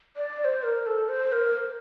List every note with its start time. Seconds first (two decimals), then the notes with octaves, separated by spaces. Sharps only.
0.17 D5
0.40 D5
0.45 C5
0.63 A#4
0.86 A4
1.09 C5
1.32 A#4